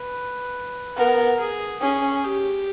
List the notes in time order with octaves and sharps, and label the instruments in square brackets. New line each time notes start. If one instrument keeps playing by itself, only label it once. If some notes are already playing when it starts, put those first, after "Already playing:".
Already playing: [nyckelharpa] B4
[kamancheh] B3 [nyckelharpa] A#4
[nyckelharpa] G#4
[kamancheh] C#4 [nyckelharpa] G#4
[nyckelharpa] G4